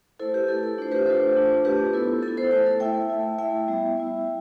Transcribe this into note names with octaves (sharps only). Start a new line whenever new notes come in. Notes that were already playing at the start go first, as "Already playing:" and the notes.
A3 E4 A4 C5
G4 B4
A3 E4 A4
A4
A3 D4 F4 C5
G4 B4
A3 D4 F4 A4 C5
A3 D4 F4
A3 D4 F4 G4 B4
B3 E4 A4
B3 A4
E4
A4 C5
A3 E4 A4
A4
A3 E4 E5 G5
A3 E4
A3 E4 E5 G5
G3 B3 E4
G3 B3 E4